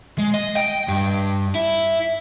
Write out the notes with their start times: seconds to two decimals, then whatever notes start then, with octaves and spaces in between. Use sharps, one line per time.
0.18 G#3
0.34 D#5
0.57 G5
0.88 G2
1.55 E4